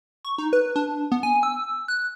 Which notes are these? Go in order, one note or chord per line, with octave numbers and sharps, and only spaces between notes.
C#6
D#4
B4
D4
B3
G#5
E6
F#6